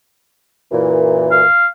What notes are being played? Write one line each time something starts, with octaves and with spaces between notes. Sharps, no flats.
F#2 A#2 E3
F5